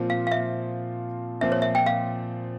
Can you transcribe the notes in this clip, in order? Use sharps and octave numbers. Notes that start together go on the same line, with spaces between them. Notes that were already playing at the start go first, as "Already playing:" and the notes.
Already playing: A#2 F3 C4 F4
F5
F5
E5
A#2 F3 C4 E5
C#5
E5
G5
F5